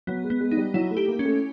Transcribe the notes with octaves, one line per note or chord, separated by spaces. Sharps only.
F#3 B3
G#3
B3
G#3
D#4
G3
F#3 E4
A3
G4
A#3
C#4
A3